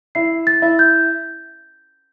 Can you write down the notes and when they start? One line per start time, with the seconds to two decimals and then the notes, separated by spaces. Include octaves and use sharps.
0.15 E4 C7
0.47 A6
0.62 E4
0.79 G6